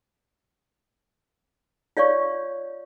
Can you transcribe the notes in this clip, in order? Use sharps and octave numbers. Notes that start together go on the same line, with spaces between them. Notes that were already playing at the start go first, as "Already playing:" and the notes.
F4 C#5 D5 F5 C#6